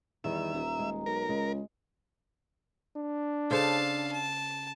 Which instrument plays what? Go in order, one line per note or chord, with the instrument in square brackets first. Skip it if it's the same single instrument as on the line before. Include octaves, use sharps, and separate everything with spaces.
[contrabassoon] E2 [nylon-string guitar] D#3 G3 [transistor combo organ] E5
[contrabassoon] D#1 [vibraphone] A#5
[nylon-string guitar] G#3
[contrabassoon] B1 [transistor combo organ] A#4
[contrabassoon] C#2 [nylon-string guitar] G#3
[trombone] D4
[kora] C#3 A4 C5 [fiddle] F5 A5
[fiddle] A5